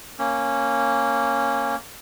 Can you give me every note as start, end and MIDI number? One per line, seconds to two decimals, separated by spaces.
0.19 1.76 58
0.19 1.76 61